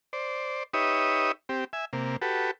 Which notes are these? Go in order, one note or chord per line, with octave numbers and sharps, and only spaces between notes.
C5 D5
D#4 G4 B4 C#5 E5 D#6
C4 G4
E5 G#5
C3 A#3
F#4 G4 A4 B4